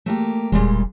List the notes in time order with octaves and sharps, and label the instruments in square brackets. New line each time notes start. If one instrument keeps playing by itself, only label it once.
[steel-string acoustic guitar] A3 A#3 G4
[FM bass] E1 [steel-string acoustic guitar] A#2 G3 G#3